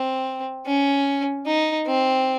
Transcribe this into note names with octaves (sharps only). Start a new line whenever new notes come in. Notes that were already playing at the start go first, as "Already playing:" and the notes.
Already playing: C4
C#4
D#4
C4